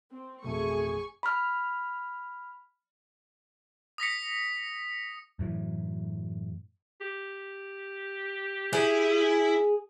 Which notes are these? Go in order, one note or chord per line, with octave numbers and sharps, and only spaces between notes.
C4
A1 F2 B2 A3 G#4 G#5 C#6
B5 F6
D#6 A#6 B6 C#7
F#2 A2 E3
G4
E4 G#4